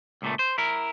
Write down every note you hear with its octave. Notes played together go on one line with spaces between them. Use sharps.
C#2 A#2 A3
C5
E4 A#4